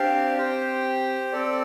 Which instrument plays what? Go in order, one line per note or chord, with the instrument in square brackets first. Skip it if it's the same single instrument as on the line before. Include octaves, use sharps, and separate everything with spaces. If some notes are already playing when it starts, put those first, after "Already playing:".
Already playing: [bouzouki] C4 [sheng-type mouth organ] D4 G4 D5 F5
[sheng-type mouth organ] G4 C5 G5
C4 A4 D5